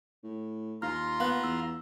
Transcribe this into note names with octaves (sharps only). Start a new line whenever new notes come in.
A2
D#2 F4 A#5 C6 F6
B3 F5 F#6
E2 E6